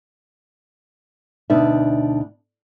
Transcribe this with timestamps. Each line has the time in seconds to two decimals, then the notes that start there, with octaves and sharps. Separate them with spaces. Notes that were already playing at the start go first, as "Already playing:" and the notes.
1.50 D2 B2 D4 D#4 E5